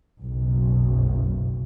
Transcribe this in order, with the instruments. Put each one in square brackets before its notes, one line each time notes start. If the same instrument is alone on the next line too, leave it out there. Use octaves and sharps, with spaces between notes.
[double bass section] F#1 B1